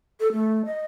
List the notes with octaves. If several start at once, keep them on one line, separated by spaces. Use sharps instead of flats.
A4
A3
D#5